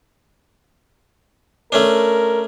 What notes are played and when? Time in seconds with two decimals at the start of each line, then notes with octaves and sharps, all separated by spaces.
1.72 A3 C#4 D4 A#4